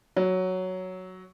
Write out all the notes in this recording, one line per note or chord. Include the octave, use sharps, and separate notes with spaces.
F#3